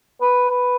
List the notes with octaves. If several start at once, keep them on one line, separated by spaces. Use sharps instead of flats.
B4
B4